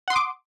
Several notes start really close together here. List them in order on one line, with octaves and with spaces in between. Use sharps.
F#5 C6 D#6 D6